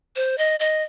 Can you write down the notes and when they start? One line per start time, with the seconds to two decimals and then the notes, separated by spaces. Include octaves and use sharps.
0.16 C5
0.38 D#5
0.60 D#5